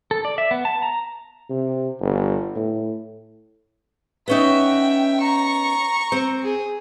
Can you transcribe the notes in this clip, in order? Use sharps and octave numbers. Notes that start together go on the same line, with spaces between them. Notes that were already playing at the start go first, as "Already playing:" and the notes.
A4
D5
E5
B3
A5
A#5
C3
G1
A2
B3 C#4 D#4 E5 G5
A#5 C#6
C4
G#4